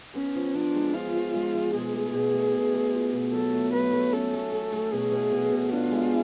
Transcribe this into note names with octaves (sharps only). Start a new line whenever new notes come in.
B3 C#4
F3
F3 D4
G#3
F3 F4
F3
G#3
F3
B2 G#4
A3
B2
A3
B2
A3
F4
B2
F#3 A4
A3
F#3 B4
A3
C#4 A4
A3
A3
A3
B2 G#4
B2
B2
B2
D4 F4
G#3